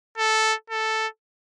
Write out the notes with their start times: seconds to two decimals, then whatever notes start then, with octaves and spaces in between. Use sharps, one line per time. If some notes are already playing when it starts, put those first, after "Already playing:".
0.18 A4
0.70 A4